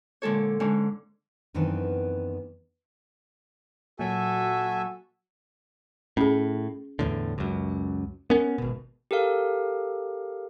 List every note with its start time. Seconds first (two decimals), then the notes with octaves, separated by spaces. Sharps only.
0.22 A#2 D3 G#3 A4 C#5
0.60 G#2 D3 G#3 C#4 D#4
1.54 F#2 D#3 E3 B3 C4 D4
3.99 A#2 F#3 F#4 A4 E5 G#5
6.17 A2 C#4 G#4
6.99 E2 A2 D3
7.38 C#2 F#2
8.30 B3 C#4 A#4
8.58 G#1 B2
9.11 G4 A4 A#4 F5